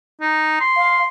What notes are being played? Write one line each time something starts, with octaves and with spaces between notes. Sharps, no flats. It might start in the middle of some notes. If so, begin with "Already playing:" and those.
D#4
C6
F5